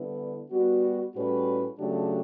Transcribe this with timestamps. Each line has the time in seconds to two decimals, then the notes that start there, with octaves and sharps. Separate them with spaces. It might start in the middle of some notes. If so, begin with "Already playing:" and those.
Already playing: D3 G3 B3 E4 B4
0.51 G3 B3 F#4
1.15 A2 G3 C#4 F#4 B4
1.78 C#3 F#3 A3 D4 G4